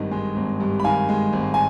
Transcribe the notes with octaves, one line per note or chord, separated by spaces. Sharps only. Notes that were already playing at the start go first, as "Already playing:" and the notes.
Already playing: G#1 G2 D#3 D#5
G#3
G#1
G2
B5
D#3 F5 G#5
G#3
G#1
G#5